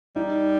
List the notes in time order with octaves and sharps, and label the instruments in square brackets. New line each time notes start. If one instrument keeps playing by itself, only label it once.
[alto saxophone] G3 [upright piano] D#4